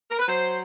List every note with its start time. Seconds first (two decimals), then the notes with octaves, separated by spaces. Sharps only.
0.11 A#4
0.19 B4
0.28 F#3 C5